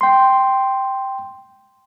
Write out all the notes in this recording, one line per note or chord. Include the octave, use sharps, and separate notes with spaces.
G5 C6